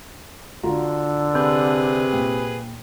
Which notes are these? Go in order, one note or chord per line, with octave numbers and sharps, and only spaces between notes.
D3 F4 F#4 A#5
C3 G#4 B4 B5 G6
A#2 G5